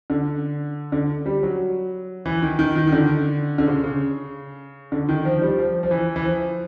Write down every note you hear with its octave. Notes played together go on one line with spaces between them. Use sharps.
D3
D3
G3
F#3
E3
D#3
D#3
D#3
D#3
D3
D3
C#3
C#3
D3
D#3
F3
G3
F3
F3
E3
E3
F3